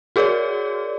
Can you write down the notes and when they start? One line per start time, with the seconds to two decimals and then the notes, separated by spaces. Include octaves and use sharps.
0.16 F#4 G#4 A#4 C#5 D5